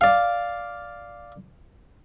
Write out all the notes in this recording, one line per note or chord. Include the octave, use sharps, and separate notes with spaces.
D5 F5